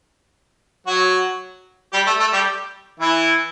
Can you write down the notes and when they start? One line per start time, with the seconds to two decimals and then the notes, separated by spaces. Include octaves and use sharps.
0.87 F#3 F#4
1.93 G3 G4
2.07 A3 A4
2.20 A3 A4
2.33 G3 G4
3.00 E3 E4